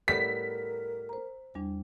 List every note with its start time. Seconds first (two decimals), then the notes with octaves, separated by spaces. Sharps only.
0.08 A2 G3 B3 A#4 B6
1.09 C5 A#5
1.55 E2 G3 D4